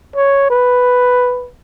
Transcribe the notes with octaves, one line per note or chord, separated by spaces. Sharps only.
C#5
B4